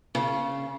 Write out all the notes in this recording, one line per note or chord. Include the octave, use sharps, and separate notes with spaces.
C#3